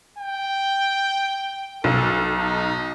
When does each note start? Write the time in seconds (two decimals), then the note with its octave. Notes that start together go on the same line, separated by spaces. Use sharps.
0.19 G5
1.84 B1 A4
2.37 D#4